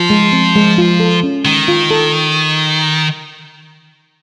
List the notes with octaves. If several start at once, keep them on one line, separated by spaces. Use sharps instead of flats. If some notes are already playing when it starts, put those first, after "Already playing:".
Already playing: F3 F4
G#3
C4
G#3
F4
A4
C#4
D#3 G#3
F4
A4